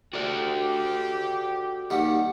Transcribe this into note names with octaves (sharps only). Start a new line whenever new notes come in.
F#4 G4 A4 D5
D#2 G3 F#5